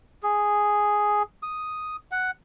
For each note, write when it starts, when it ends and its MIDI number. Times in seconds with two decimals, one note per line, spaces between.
0.23 1.23 68
1.43 1.96 87
2.11 2.31 78